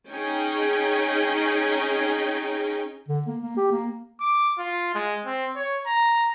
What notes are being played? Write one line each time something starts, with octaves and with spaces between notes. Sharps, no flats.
C#4 D#4 G#4 G5
D3
A#3
A#3
G4
A#3
D6
F4
G#3
C4
C#5
A#5